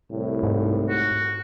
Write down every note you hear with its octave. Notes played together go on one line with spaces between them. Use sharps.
C2 A2
G#2
F#4